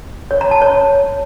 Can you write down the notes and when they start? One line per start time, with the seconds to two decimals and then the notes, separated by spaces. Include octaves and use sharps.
0.31 C#5
0.41 A#5
0.51 A5
0.62 C#5